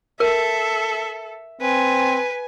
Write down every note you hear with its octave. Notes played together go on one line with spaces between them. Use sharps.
A4 A#4 E5
C4 B4 G#5